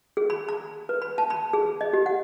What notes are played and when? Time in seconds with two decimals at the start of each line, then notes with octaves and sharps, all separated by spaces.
0.17 G#4
0.30 B5
0.49 A#5
0.89 B4
1.02 B5
1.18 A5
1.30 B5
1.53 G#4
1.81 D#5
1.93 G4
2.06 F#5